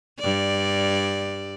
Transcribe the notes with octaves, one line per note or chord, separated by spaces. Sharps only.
G2 D5